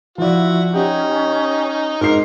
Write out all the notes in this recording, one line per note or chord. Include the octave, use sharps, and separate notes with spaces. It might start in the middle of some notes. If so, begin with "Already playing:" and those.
F3 E4 F#4 D5
C#4 D#4 G4
G#2 A#4 C7